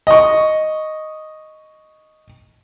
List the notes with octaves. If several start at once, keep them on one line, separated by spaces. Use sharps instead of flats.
D#5 C#6